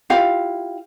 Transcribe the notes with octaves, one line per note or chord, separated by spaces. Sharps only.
E4 F4 G4 F5